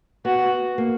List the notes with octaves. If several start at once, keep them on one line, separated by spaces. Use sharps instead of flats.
B3 F#4
A#3